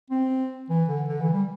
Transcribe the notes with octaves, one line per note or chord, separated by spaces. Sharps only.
C4
E3
D3
D3
E3
G3